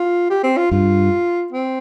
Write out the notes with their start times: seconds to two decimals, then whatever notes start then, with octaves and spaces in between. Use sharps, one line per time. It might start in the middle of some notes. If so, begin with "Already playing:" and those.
Already playing: F4
0.30 G4
0.44 C4
0.57 F4
0.71 G2 F4
1.53 C4